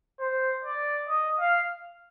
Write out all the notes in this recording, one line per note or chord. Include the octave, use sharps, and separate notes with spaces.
C5
D5
D#5
F5